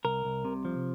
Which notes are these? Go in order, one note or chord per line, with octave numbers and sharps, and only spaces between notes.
C2 A#4
C2
C3
F3